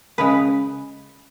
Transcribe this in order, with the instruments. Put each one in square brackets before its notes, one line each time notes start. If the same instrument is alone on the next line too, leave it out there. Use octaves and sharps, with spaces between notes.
[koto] C#3 G#3 B4